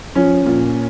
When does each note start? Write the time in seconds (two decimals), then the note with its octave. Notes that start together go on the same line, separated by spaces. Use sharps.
0.15 F3 C#4
0.46 A#2